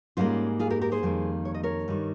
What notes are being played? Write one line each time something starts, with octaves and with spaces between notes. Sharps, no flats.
G#2 G3 A#3 C#4 F4
F4 G#4
G4 A#4
G4 A#4
G#4 C5
F2 D#3 G3 A#3
C#5
D#5
A#4 C#5
G2 D#3 G3